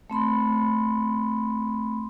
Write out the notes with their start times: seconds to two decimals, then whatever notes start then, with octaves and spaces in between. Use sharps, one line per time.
0.10 A3 C4 B5 C6